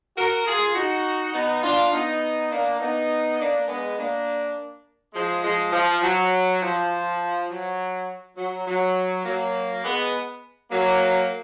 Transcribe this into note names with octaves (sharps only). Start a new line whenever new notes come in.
F#4 A#4
F4 G#4
D#4 F#4
B3 D#4
D4 F4
B3 D#4
A#3 D4
B3 D#4
A#3 D4
G#3 B3
A#3 D4
F3 G#3
F3 G#3
F3
F#3
F3
F#3
F#3
F#3
F#3 A#3
G#3 B3
F#3 A#3